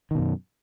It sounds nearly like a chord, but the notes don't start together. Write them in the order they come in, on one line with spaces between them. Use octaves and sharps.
D#3 B2 F#2